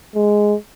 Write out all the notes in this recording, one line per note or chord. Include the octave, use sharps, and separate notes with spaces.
G#3